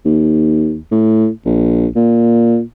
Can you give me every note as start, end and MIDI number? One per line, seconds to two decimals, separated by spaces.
0.05 0.78 39
0.92 1.29 45
1.45 1.87 34
1.96 2.61 46